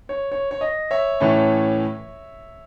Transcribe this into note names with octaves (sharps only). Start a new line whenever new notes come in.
C#5
C#5
C#5
D#5
C#5 E5
A2 E3 A3 C#4